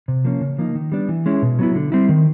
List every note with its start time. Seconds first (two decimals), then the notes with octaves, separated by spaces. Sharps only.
0.08 C3
0.25 F3 A#3 C#4
0.41 C#3
0.58 F3 A#3 D#4
0.75 D#3
0.92 G3 B3 D4
1.09 E3
1.26 G#3 C#4 E4
1.42 B2
1.59 F#3 B3 E4
1.76 D3
1.92 G3 C4 E4
2.09 D#3